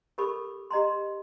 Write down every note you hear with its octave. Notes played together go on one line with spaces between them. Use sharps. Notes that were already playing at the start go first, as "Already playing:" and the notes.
G4 A4 A#4 B5 C#6 D6
G4 D#5 A#5 C6